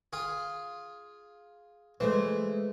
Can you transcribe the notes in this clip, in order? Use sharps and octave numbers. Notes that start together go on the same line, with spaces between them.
F4 G#4
E3 G#3 A3 C5